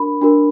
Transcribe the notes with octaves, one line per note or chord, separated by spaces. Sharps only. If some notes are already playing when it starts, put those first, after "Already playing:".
Already playing: D4 F#4 A#4 B5
D4 F#4 A#4